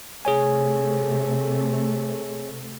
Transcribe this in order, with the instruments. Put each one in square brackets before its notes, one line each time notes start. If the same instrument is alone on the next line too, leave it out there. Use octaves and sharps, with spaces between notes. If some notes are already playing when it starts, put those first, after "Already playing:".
[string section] C3 A3 [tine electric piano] G#4 C#5 G#5